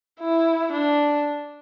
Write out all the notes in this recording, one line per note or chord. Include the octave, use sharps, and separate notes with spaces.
E4
D4